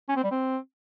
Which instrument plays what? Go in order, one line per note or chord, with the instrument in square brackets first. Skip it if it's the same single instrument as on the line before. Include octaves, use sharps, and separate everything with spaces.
[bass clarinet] C#4
C4
G3
C4